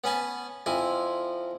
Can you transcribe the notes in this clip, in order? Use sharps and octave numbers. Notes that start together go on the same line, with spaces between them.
B3 C#4 B4 G#5 A5
F2 F3 E4 G#5